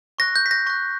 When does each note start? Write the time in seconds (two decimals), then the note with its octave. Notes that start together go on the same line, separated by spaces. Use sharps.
0.19 C#6 F#6 A#6
0.36 G6
0.46 B6
0.51 A#6
0.66 C#6 F#6 A#6